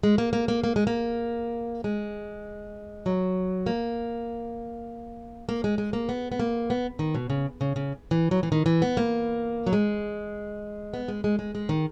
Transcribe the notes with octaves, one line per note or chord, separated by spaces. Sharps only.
G#3
A#3
A#3
A#3
A#3
G#3
A#3
G#3
F#3
A#3
A#3
G#3
G#3
A#3
B3
B3
A#3
B3
D#3
B2
C#3
C#3
C#3
E3
F#3
E3
D#3
E3
B3
A#3
F#3
G#3
B3
G#3
G#3
G#3
G#3
D#3